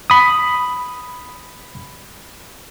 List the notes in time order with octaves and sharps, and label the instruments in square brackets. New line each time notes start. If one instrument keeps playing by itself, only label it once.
[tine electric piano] B5 D#6